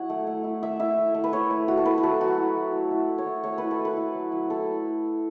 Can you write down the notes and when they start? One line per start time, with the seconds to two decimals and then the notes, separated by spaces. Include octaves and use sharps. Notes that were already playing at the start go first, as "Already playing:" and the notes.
Already playing: F#3 E4 C#5 F#5
0.10 A3
0.27 A3
0.44 E4
0.63 A3 E5
0.79 E4 E5
0.98 A3
1.14 A3
1.24 B4
1.32 E4 C#5
1.50 A3
1.68 A3 F#4
1.77 A4
1.85 E4 B4
1.98 F#4
2.03 F#3 A4
2.21 F#3 F#4
2.38 E4
2.56 A3
2.73 A3
2.91 E4
3.09 A3
3.18 C#5
3.26 A3
3.44 A3 C#5
3.58 E4 B4
3.71 A4
3.79 A3
3.85 B4
3.97 E4
4.15 F#3
4.32 F#3
4.50 E4 A4